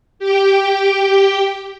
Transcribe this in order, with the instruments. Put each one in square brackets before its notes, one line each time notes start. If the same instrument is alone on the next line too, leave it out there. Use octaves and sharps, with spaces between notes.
[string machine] G4 G5